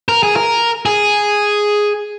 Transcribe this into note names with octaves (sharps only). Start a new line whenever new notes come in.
A#4
G#4
A#4
G#4